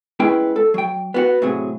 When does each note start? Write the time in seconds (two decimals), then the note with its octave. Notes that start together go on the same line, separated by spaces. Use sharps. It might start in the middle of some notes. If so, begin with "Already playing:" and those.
0.20 G#3 B3 C#4 E4 G#4 G5
0.56 A4
0.74 F#3 G5
1.14 B3 F#4 F#5
1.42 A2 C3 F#3 G#4